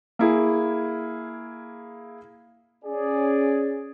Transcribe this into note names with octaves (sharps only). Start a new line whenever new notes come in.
A#3 E4 G#4
C#4 G#4 D5